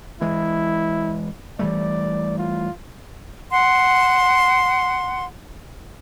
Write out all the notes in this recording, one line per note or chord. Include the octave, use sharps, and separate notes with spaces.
E3 G#3 E4
E3 G3 A3 D5
F4
F#5 C6